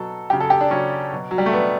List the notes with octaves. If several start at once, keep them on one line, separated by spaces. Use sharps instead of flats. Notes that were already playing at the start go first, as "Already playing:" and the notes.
Already playing: B2 F#3 A4
C#3 F#3 G4
A4
G4
D4
C#3 F#3 C#4
B2 F#3
F#3
G3
A3
B2 F#3 B3